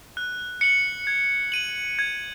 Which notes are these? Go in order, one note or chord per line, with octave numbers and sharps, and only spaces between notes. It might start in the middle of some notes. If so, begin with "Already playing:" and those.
F#6
C#7 F#7
G#6
D#7 F#7
G#6